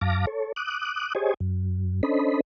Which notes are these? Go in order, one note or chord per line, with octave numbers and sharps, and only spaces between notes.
F#2 F5 A5 D6 A#6
A4 C#5
D6 D#6 F#6
G4 G#4 C5 C#5 D#5 G#5
F#2
C#4 D4 A4 C5 D#5 B5